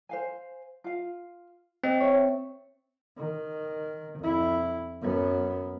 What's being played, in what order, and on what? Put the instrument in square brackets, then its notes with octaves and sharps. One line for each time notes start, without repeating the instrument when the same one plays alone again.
[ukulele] C5 F5 G#5
F4 F5
[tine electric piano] C4 [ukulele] G4 D#5
[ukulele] C#5 E5
[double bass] D#3
F2 E4
F#2 B3